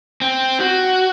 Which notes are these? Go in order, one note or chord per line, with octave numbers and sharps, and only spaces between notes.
C4
F#4